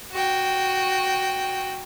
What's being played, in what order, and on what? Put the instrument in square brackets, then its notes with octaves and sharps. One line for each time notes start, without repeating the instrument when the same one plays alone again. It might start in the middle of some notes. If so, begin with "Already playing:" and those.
[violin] F#4 G5